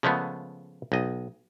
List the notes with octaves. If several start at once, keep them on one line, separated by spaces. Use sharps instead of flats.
C#3 F3 G#3 A3 B3
B1 D#5